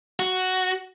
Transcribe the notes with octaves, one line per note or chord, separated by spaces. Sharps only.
F#4